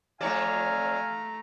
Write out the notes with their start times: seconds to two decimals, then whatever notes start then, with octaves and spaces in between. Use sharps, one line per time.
0.21 F2 A3 C#5 D5 F5 G#5 A#5